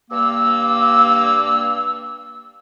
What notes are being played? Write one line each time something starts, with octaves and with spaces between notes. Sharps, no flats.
G2 A#3 E6